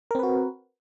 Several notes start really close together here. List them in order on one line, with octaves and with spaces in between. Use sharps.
A#4 C4 B4 F#4